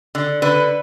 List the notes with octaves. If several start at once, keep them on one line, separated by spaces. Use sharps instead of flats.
D3
D3 B4